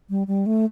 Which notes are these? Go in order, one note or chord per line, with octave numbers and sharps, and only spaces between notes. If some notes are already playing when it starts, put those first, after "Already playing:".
G3
G3
A3